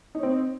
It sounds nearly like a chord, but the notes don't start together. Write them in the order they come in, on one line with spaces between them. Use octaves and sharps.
D#4 C#5 C4